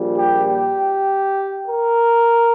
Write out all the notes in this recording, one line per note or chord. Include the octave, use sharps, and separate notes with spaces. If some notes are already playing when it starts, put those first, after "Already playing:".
Already playing: A#1 A#2 G3
G4
G4
A#4